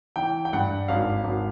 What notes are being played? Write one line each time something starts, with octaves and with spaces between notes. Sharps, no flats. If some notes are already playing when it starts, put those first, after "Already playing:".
E3 G5
G5
G2 F#5
G#1 F5
G#1